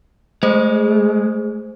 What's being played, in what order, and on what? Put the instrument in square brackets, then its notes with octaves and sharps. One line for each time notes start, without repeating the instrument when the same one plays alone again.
[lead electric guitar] G#3 [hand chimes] A3 G#4 C5